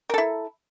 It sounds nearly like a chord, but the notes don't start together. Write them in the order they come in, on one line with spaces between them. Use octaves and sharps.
A#4 A4 E4